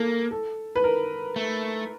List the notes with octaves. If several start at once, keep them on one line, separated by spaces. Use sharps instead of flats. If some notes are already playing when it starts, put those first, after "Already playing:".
Already playing: A#3 A4
A4
B4
A#4
A3